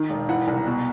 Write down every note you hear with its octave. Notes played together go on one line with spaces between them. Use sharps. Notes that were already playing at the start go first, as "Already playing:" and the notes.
Already playing: D#3
E1
E3 F#5
C2
B2